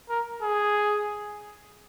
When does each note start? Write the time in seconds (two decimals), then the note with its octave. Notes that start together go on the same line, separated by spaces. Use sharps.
0.09 A#4
0.43 G#4